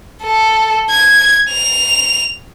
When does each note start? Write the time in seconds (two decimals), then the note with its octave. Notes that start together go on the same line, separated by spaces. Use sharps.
0.23 A4
0.91 G#6
1.50 F7